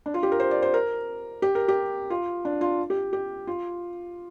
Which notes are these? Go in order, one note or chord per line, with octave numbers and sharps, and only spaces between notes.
D4
F4
G4
A#4
C5
D5
C5
A#4
G4
A#4
G4
F4
D4
F4
G4
G4
F4